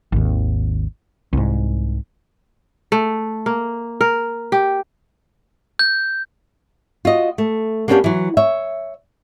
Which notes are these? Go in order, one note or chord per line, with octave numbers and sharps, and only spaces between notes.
G#1 D#2
C2 G#2
A3
A#3
A#4
G4
G6
F4 F#4 D#5
A3
A#3 B3 C#4 D4 F4 G4
E3 F#3
C#5 E5